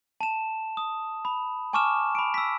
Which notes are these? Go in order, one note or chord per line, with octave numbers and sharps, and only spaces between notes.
A5 E7
D#6
B5
G#5 A5 C#6 D6 F6 E7
B5 D7
E6 B6